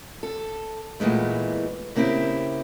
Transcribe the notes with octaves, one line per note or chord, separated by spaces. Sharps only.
A4
E2 A#2 E3 G#3 A3
C#3 A#3 C4 E4 G4